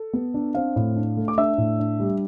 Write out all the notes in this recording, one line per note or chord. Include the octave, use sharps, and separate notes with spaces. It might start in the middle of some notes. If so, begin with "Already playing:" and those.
Already playing: A4
B3
D4
C4 F5
A2
D4
A3
D6
D4 E5 E6
A2
D4
G3